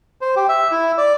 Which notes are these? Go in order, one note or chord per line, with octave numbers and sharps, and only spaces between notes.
C5
G4
E5
E4
D5